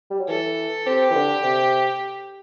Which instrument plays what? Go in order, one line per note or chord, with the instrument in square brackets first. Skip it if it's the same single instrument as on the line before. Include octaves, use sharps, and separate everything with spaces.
[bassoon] G3
F#3
[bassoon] E3 [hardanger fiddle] A4
[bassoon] C4 [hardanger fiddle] G4
[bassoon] E3
D3
C3